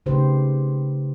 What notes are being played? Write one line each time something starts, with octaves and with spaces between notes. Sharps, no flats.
C#3 A3 D#4 G4 B4 C5